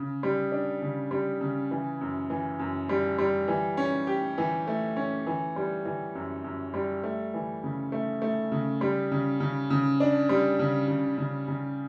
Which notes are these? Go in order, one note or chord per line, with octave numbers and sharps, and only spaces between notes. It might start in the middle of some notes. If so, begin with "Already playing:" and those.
Already playing: C#3
G3
D4
C#3
G3
C#3
E3
F#2
E3
F#2
G3
G3
E3
C#4
G4
E3
A3
C#4
E3
G3
E3
F#2
F#2
G3
A3
E3
C#3
A3
A3
C#3
G3
C#3
C#3
C#3
D4
G3
C#3
C#3
C#3
C#3